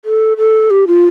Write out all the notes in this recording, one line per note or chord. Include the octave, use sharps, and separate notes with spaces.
A4
A4
G4
F4